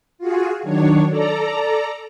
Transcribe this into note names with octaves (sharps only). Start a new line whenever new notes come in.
F4 F#4 G#4
D#3 F#3 D4 C#5
A4 D5 A#5